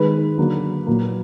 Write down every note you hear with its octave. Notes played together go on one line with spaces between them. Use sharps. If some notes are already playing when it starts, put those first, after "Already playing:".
Already playing: D#3 G#3 B4
D3 F#3 A#3
A#2 F#3 A#3